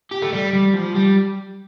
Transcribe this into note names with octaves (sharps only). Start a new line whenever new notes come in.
G4
A3
G3
G3
F3
G3